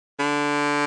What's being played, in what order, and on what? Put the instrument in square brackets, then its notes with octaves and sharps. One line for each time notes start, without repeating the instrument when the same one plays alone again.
[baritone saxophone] D3